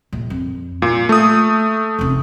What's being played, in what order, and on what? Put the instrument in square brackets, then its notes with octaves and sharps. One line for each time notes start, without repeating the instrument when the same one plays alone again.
[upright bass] A#1
F2
[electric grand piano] A#2 [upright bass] A#3
[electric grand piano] A3 D#6
[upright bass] F1 F#2